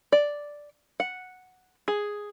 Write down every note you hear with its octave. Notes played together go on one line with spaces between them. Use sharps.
D5
F#5
G#4